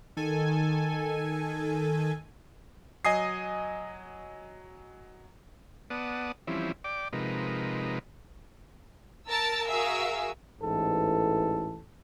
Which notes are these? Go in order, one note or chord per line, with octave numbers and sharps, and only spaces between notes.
D#3 A4 G#5
F#3 D#5 G#5 D#6 C7
B3 D5 F#5 A5 D#6
E3 F3 G3 C4 C#4 E4
D5 G5 D6
C3 F3 G#3 D#4 A#4 B4
A#4 A5 E6 A6
F#4 G#4 A#4 E5 F5 E6
A1 G#2 E3 A4